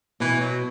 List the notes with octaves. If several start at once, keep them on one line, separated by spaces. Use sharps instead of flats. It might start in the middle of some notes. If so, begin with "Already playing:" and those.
B2 E3
F#3